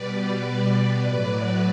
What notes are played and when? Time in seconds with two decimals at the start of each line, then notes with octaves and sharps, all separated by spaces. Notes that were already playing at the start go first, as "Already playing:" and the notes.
Already playing: B2 G3 B4 D5
1.02 A2 F#3 B4 D5